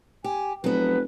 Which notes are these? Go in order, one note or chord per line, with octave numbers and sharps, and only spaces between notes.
G4 G#5
F1 F#3 B3 B4